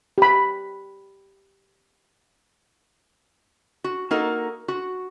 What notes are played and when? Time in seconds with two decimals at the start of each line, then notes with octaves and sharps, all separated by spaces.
0.18 G4 B5
3.84 F#4
4.11 A#3 D#4 F#4 A4 A#4
4.68 F#4